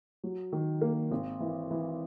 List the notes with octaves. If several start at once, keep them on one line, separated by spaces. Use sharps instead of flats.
F#3
D#3
A#3
G#1
E3
E3